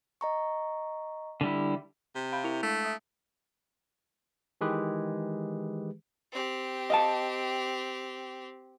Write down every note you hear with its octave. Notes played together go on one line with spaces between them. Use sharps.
D#5 A#5 C#6
D3 G3 E4
C3
F5 B5 G6
E4 E5 F7
G#3 A3
E5 D#6
D#3 E3 G#3 G4 G#4 B4
C4 G4
D#5 F5 A5